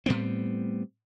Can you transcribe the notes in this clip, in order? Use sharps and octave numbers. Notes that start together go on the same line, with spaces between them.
A2 G3 B3 C4